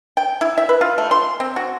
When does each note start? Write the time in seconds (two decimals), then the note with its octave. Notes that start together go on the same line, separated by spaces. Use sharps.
0.17 G5
0.41 E4
0.58 E5
0.69 B4
0.81 F4
0.98 A3
1.11 C6
1.40 C4
1.56 F#4